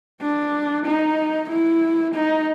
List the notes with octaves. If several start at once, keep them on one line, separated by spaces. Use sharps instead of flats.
D4
D#4
E4
D#4